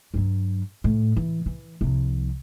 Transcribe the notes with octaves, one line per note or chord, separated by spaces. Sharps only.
G2 F#3
A2
E3
E3
C2 F3